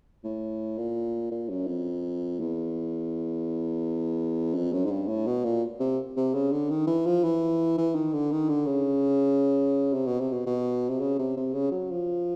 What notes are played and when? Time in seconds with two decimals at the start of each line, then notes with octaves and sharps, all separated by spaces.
0.24 A2
0.78 A#2
1.31 A#2
1.49 F#2
1.67 F2
2.40 E2
4.55 F2
4.73 F#2
4.85 G#2
4.91 G2
5.08 A2
5.26 B2
5.44 A#2
5.80 C3
6.17 C3
6.34 C#3
6.52 D3
6.70 D#3
6.87 E3
7.06 F3
7.24 E3
7.78 E3
7.95 D#3
8.13 D3
8.32 D#3
8.49 D3
8.67 C#3
9.93 C3
10.07 B2
10.20 C3
10.33 B2
10.46 B2
10.89 C3
11.00 C#3
11.19 C3
11.37 C3
11.54 C#3
11.72 F#3
11.91 F3